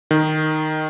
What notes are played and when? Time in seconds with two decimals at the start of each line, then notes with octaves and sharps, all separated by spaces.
0.11 D#3